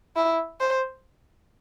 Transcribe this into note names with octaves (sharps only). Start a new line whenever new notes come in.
E4
C5